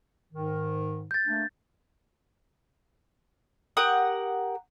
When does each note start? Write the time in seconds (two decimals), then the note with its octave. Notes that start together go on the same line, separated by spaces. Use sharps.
0.33 G#2 D#3
1.11 G6 A6
1.27 A3 A#3 D4
3.77 G4 A#4 F#5 D#6